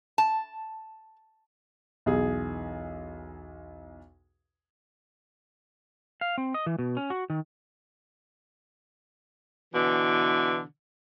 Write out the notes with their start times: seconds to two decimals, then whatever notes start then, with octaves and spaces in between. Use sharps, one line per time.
0.18 A5
2.06 B1 E2 G#4
6.21 F5
6.38 C4
6.54 D#5
6.66 E3
6.79 B2
6.97 C#4
7.10 F#4
7.30 D#3
9.73 B2 D3 E3